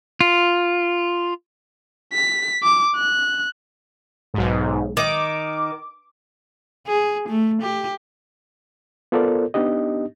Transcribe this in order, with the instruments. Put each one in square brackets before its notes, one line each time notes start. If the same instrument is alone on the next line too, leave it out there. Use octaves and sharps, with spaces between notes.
[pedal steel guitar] F4
[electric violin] B6
D6
F#6
[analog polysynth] B1 G#2
[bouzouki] D#3 [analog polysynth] D6
[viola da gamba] G#4
A3
G4
[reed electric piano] B3 F4 A4 A#4 C5 D5
B3 D4 D#4 G4 D#5